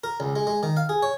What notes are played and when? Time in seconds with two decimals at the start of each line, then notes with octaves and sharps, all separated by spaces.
0.04 A#4
0.20 C#2
0.36 G#3
0.47 G#3
0.63 D#3
0.77 F5
0.89 G#4
1.03 C#5